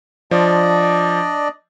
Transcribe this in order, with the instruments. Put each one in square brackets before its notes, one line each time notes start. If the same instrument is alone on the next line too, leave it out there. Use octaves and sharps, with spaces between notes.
[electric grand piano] F3 [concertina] D4 D5 D#5